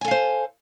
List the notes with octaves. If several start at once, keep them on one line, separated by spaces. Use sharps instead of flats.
A4 C5 F5 G#5